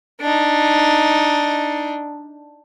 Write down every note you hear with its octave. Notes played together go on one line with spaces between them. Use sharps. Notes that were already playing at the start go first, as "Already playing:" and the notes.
D4 D#4